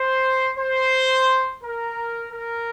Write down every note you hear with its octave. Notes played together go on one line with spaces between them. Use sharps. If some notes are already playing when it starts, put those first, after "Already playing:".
Already playing: C5
C5
A#4
A#4